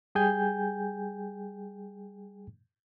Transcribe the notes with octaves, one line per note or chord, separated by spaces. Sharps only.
G3 G#4 G5 G#5 G6